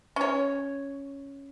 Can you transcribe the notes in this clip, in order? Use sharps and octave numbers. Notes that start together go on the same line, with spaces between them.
C#4 C#5